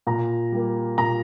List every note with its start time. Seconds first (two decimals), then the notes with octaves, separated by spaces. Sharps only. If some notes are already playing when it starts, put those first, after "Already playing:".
0.07 A#2 A#5
0.52 G3 A#3
0.98 A#2 A#5